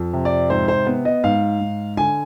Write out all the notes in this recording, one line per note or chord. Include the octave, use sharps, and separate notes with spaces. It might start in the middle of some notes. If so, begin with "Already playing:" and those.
Already playing: F2
C3
D5
G#2 C5
C5
B3
D#5
G#2 F5
G#2
D3 G#5